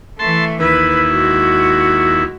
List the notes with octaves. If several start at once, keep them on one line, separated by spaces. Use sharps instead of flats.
E3 A3 A5 C6
D#2 E4 B4
G#3 F#4